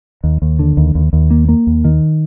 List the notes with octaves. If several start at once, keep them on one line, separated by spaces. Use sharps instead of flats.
D#2
D#2
D3
D#2
D#2
D#2
A#3
A#3
D#2
D#3